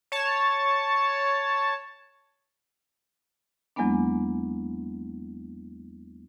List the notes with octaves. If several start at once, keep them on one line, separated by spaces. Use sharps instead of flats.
C#5 A5
E2 F#3 G#3 A#3 B3 D4